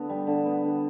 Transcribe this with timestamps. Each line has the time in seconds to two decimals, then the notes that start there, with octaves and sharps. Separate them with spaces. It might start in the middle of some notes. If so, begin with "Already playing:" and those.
Already playing: D3 B3
0.09 G3
0.27 D3
0.46 B3
0.64 D3